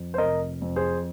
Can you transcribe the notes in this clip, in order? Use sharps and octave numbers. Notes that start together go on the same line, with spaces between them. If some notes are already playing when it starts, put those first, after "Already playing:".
Already playing: F2
C5
F1 A#4 D#5
F2
G#4 C5